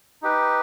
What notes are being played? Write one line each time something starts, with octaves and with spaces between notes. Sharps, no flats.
D#4 G4 B4